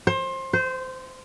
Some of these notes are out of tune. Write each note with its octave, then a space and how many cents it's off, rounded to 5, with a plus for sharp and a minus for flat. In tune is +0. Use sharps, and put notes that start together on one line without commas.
C5 +25
C5 -20